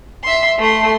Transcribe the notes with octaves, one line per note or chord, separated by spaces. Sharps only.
E5 C6
A3 C6